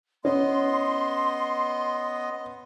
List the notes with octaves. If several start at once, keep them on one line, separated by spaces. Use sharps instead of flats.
B3 C#4 D#5 C6